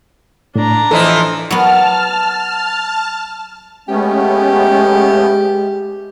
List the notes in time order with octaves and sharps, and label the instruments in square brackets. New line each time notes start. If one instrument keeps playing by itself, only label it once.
[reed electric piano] A2 [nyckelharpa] D4 A#5
[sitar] E3 F3 E4 [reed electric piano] A4 D5 D#5
[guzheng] F#3 B3 [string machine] A5 F6
[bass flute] G#3 [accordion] A3 B3 C#4 [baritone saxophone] G4